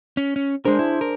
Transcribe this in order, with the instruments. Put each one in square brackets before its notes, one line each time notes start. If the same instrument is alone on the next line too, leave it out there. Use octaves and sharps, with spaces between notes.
[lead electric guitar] C#4
C#4
[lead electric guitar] G#3 A#4 [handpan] D4 G#4 C5
[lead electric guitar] E4
A#4